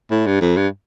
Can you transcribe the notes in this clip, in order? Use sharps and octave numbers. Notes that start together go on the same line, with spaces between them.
A2
G2
F2
G2